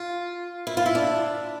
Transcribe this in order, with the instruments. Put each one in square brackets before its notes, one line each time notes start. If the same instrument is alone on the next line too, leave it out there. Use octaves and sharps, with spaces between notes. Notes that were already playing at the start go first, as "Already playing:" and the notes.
Already playing: [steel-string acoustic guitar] F4
E4
F4
E4
D4